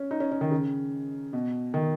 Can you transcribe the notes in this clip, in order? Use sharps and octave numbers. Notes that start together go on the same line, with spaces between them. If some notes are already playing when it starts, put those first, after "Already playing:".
Already playing: C#4
D#4
C#4
C#4
D#3
C#3
B2
D#3